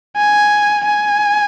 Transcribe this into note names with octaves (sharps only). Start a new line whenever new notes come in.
G#5
G#5